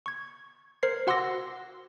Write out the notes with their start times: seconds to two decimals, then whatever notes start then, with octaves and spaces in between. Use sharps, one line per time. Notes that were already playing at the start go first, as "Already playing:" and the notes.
0.06 C#6 G#6
0.83 A#4 C5 G#6 C7
1.07 F#4 F#5 C6 D6 E6 A#6